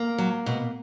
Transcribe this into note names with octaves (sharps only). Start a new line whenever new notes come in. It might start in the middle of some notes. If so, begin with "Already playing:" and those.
Already playing: A#3
F#3
B2